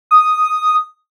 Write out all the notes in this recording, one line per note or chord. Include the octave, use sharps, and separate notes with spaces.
D#6